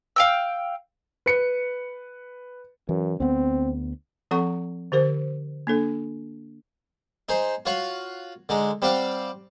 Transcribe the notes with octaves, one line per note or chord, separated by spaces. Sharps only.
F5 G5 E6
B4 C#7
F#2 E3
D2 B3 C4
F3 C4 A4 F#5 A#5 C#6
D3 G4 A#4 C5
A#3 D4 A4
D#4 G#4 C5
F4 F#4 C#5 F5 F#5
D3 G#3 D#4
G3 C4 G4 F5 F#5